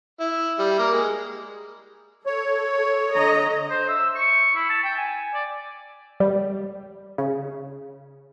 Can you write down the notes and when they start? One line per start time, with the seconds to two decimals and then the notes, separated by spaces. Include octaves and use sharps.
0.20 E4
0.59 G3
0.79 A#3
0.93 G#3
2.26 A4 C#5
3.12 D3 D#5 A#5
3.70 C5
3.88 E5
4.16 C#6
4.55 E4
4.69 A5
4.84 G5
4.97 G#5
5.34 D5
6.20 G3
7.18 C#3